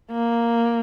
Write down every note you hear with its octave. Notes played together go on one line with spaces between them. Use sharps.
A#3